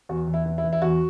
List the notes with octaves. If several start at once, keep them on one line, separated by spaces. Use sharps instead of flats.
E2 F#4
E2
E4
E3
E4
E3
E4
E2 F#4